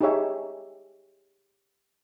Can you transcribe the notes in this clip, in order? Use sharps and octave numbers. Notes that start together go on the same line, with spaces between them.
D#4 G4 G#4 C#5 E5